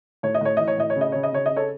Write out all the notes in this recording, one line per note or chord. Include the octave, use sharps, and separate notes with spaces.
A2 C#5
D#5
A2 C#5
E3 D#5
C#5
A2 D#5
C#5
C#3
D#5
C#3 C#5
D#5
C#3 C#5
C#3 D#5
A4 C#5